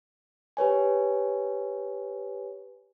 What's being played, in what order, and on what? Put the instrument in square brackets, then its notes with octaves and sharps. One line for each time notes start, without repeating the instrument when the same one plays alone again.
[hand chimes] G4 B4 C#5 G#5